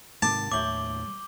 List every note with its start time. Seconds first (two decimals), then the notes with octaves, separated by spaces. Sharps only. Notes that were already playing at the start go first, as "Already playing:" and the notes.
0.22 G#2 C3 D#3 A5 D6
0.52 D#2 A2 C#5 E5 D6 G6 F#7 G7